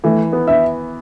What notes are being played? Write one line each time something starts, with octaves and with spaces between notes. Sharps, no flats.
E3 A3
B3
E5